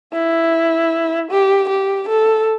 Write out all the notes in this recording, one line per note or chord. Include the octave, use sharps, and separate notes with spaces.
E4
G4
G4
A4